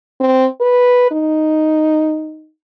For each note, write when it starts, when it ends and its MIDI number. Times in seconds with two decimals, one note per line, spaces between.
0.20 0.46 60
0.61 1.11 71
1.11 2.49 63